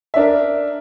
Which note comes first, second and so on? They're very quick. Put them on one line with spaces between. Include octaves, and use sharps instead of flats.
E5 D4 A#4